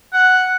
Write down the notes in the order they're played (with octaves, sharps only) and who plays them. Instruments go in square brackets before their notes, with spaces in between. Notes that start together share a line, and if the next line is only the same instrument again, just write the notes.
[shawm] F#5